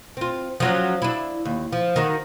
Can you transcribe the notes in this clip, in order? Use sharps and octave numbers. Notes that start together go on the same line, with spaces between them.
C4 F4
F3 F#3 C#4
D4 E4
D#2
F3
D#3 D#4 F#4